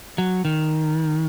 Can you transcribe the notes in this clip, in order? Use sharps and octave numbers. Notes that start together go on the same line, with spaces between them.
F#3
D#3